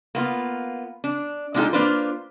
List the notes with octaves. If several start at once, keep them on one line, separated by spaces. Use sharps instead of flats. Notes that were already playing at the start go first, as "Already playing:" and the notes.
A#3 B3 F4
D4
G#3 D4 D#4 F4 G4 A4
A#3 D4 F4 B4 C5